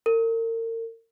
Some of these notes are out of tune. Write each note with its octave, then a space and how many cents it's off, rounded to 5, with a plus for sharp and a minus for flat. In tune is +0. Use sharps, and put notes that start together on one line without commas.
A#4 -40